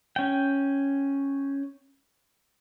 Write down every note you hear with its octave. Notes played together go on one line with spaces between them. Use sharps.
C#4 G5